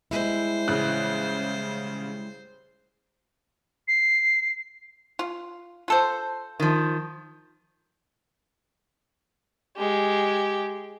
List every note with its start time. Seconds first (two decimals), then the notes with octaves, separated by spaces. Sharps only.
0.11 G3 G#3 E4 C5
0.68 A1 C#3 F#6
3.88 C7
5.19 F4
5.88 F4 A4 C5
6.60 D#3 F3
9.77 G#3 G4